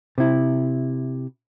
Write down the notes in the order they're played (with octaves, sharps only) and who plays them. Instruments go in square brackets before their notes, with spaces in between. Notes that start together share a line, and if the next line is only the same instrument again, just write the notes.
[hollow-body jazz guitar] C3 E4